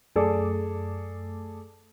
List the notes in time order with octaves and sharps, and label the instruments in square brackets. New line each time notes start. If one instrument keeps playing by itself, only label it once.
[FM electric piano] F#2 A3 D6 [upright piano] G#4 A4 D5